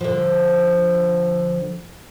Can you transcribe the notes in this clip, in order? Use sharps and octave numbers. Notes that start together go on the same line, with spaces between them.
D3 F3